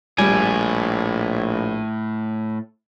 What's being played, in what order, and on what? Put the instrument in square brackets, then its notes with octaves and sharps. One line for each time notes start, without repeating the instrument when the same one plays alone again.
[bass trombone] A#1 [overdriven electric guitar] A2 [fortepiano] G3 [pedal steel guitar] G#5